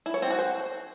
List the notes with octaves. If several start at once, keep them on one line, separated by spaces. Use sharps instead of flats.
E4
C#5
C4
F#4
C5